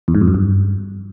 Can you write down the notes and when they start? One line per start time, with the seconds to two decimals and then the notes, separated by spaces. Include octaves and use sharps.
0.08 E2
0.15 G#2
0.21 F2
0.28 F#2
0.34 G2